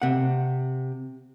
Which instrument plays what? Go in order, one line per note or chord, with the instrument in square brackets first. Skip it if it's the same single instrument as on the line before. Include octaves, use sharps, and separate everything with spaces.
[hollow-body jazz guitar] C3 F#5